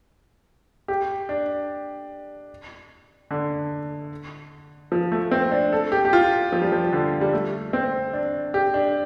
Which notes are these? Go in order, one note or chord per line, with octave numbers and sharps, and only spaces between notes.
G4
D4
D3
F3
A3
C4
D4
A4
G4
G4
F4
F3
G3
F3
D3
G3
A3
C4
D4
G4
D4